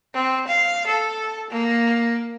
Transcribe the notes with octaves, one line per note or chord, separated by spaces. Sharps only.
C4
F5
A4
A#3